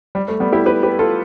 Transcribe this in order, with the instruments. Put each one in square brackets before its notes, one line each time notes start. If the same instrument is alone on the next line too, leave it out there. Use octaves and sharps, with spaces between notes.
[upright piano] G3
A3
G3 B3
E4 G4
G4 B4
G4 B4
F4 A4